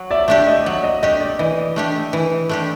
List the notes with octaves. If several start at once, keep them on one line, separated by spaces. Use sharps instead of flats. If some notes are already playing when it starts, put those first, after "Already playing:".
Already playing: F#3
D5 E5
A3 D4 G4 D5 E5
D#5
F#3 D5
D#5
A3 D4 G4 D#5
D5
E3 D#5
A3 D4 G4
E3
A3 D4 G4